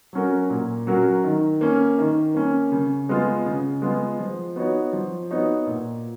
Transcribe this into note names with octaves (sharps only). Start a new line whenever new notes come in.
F#3 C#4 F#4 A#4
A#2
F#3 C#4 F#4 A#4
D#3
A#3 C#4
D#3
A#3 C#4
C#3
G#3 B3 F4
C#3
G#3 B3 F4
F3
B3 D#4 F#4 C#5
F3
B3 D#4 F#4 C#5
A#2